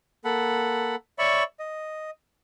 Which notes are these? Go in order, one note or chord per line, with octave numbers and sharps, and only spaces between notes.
A#3 A4 F#5 B5
C#5 D5 E5 B5 C#6
D#5